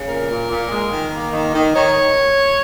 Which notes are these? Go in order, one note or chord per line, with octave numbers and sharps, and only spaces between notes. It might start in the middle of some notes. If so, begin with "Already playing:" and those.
Already playing: C#3
A#2 A#4
A#2
A#2
G#3
D#3
A#3
D#3
D#3
D#3 C#5